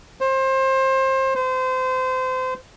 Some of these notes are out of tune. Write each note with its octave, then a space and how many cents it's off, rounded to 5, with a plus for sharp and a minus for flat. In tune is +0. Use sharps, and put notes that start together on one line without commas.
C5 +25
C5 -30